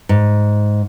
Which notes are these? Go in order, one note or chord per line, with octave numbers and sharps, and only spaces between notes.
G#2